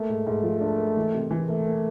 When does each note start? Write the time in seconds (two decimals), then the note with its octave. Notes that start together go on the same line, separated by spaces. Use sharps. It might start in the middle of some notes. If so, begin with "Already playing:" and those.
Already playing: A3 A#3
0.09 G#2
0.27 G#2
0.43 F3
0.61 D4
0.78 A#3
0.97 E3
1.14 C3
1.31 E3
1.48 A3 A#3
1.66 A#3